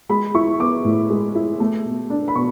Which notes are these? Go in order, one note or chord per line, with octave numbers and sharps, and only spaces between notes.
G#3 B5
E4 C#6
B3 D6
A2
G#3
E4
A3
B2
D4
B5
B2 C#6